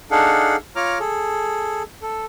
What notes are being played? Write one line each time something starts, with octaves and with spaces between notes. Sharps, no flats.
D4 D#4 G#4 A4 F5 F#5
F4 C#5 A#5 D6 F6
G#4 A4
A4